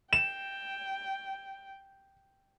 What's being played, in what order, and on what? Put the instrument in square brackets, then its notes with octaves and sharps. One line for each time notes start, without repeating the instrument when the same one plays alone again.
[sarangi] G5 [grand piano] E7